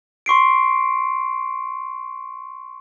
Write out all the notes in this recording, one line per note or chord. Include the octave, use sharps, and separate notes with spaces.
C6 C#6 C7 D7